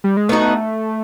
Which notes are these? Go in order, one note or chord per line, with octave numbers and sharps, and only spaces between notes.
G3
G#3
A3 B3 D#4 F#4